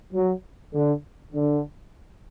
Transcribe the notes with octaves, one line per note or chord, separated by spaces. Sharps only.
F#3
D3
D3